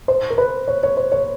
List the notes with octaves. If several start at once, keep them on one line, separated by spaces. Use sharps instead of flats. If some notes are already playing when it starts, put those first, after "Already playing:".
C5
A#4
B4
C#5
C#5
C5
C#5